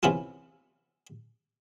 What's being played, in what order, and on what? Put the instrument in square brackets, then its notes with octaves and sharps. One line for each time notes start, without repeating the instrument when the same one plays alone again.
[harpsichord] C3 E3 B3 C#4 E4 F4